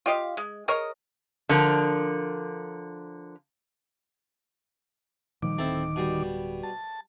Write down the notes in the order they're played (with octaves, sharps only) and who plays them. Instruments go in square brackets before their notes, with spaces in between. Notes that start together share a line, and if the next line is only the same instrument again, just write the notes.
[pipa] F4 G4 D#5 F5
G#3
G#4 A#4 C#5 D#5
[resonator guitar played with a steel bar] D3 F3 A#4
[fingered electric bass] A#2 F3 G3 [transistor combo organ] D#3 D6
[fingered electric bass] D1 [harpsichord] C4 E4 A4
[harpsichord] B2 G3
[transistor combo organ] A5